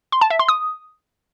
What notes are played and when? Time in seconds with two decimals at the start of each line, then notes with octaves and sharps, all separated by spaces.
0.12 C6
0.21 A5
0.30 E5
0.39 C6
0.48 D#6